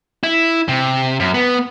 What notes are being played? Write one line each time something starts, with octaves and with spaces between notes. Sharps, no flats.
E4
C3
F#2
B3